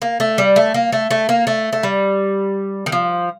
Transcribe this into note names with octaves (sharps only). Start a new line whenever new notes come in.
A#3
A3
G3
A3
A#3
A3
A3
A#3
A3
A3
G3
D#3
F3